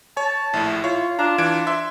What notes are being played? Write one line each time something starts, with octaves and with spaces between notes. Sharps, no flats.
C#5 A5
A#1 A2 E4
F4 C#5
D4 F4 A#5
E3 D4 G#6 D7
E5 C6